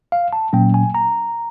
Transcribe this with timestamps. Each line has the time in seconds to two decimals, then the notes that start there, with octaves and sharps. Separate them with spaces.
0.12 F5
0.33 A5
0.53 A#2 F#3 A#3 C#4 G5
0.74 G#5
0.95 A#5